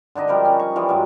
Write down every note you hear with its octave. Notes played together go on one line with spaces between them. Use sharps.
D3 D4 D#4 D#5
F3 G3 G4 A#4
C#4
C#6
E3 F3 G3 D5
G2 F#3 G#3